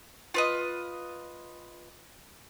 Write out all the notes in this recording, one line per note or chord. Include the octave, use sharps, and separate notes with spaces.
F4 B4 D#5